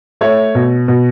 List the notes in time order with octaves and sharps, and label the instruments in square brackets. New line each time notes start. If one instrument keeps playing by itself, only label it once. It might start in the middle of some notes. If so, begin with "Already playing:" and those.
[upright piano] A3 C#5
B2
B2